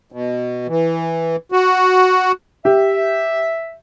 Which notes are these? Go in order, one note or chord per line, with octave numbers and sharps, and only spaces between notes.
B2
E3
F#4
G4 E5